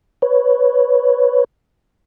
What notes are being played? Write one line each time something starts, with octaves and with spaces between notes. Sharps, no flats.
B4 C#5